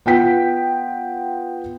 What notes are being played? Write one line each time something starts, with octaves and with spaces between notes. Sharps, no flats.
B3 F4 G5 B6